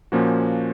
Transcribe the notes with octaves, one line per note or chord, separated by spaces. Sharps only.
A#2 F3 A#3 C#4 F#4